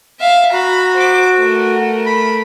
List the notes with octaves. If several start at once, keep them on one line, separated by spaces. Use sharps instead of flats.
E5 F5
F#4 A#5 B5
C5 D6
A3 A#4
B5